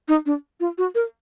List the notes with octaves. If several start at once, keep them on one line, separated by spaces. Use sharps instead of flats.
D#4
D4
F4
F#4
A#4